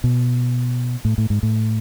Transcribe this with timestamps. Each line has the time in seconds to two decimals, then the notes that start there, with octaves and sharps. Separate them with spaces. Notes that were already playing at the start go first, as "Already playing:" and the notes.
0.04 B2
1.05 A2
1.18 A2
1.30 G#2
1.43 A2